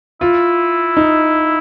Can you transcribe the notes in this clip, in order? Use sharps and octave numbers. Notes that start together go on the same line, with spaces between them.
E4 F4
D#4